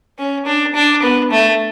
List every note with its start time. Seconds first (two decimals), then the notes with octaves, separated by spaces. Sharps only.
0.18 C#4
0.46 D4
0.75 D4
1.02 B3
1.31 A3